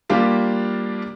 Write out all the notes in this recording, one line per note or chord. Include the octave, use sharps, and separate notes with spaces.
G3 A#3 D4 F4 G4